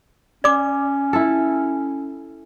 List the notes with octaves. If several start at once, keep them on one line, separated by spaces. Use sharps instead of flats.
C#4 D5 D6
E4 A4